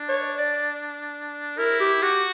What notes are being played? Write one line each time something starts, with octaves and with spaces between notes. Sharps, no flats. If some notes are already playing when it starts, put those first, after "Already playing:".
Already playing: D4
C#5
D5
E4 A#4
G4
F#4 G4